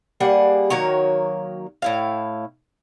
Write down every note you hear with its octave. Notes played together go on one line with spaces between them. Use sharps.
G3 A#3 G#4 F#5
D#3 F#3 A#3 C#5
A2 E4 F5